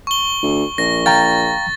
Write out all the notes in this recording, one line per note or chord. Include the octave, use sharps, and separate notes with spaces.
C#6 G7
D2
A#1 A#6
F5 G5 A#5 A6